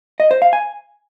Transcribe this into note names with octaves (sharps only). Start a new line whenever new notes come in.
D#5
C5
F5
G#5